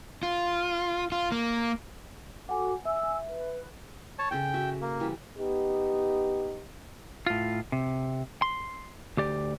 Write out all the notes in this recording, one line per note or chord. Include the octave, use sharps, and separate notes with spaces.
F4
F4
A#3
F#4 A4 F#5 G#5 D6
E5 G#5 E6
B4
C#5 A5
C#3 A4 C5 G5
F#4 E5
A#3
E3 G3
B3 D#4 G4
A2 F4
C3
C6
D2 G4 D5